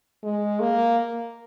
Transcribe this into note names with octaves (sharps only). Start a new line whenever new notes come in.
G#3
A#3